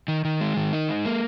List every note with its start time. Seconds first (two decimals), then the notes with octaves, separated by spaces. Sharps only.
0.08 D#3
0.25 D#3
0.41 G#3
0.57 D#3
0.73 D#4
0.89 G#3
1.05 A#3